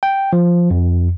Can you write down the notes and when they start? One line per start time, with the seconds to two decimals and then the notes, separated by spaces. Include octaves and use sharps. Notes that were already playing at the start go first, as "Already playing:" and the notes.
0.03 G5
0.33 F3
0.71 F2